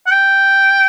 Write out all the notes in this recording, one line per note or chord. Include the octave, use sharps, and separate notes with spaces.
F#5
G5